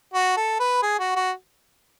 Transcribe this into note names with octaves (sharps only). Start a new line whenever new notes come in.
F#4
A4
B4
G#4
F#4
F#4